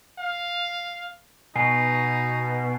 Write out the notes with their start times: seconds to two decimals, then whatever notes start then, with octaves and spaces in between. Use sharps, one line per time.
0.18 F5
1.56 B2 D#4 G#5 C7